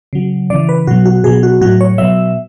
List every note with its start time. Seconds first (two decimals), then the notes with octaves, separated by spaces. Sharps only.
0.13 C#3 F#3
0.50 C#3 E3 D5
0.69 B4
0.87 B2 F#3 F#4
1.06 F#4
1.24 B2 F#3 G#4
1.43 F#4
1.61 A2 F#3 F#4
1.81 C#5
1.98 B2 F#3 E5